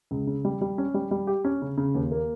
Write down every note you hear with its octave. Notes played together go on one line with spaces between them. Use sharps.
C#2
C#3
G3
G3
C#4
G3
G3
G4
C#4
C#3
C#3
D#2
A#3